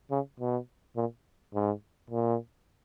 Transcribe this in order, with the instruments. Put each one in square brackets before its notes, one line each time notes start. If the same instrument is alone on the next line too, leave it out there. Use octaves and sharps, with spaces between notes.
[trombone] C#3
B2
A#2
G#2
A#2